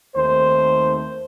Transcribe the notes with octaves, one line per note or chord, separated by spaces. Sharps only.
D#2 D#3 A3 C4 C5